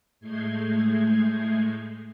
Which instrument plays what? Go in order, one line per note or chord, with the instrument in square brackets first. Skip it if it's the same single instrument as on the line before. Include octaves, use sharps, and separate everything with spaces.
[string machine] A2 G#3 A3 G6 G#6 C7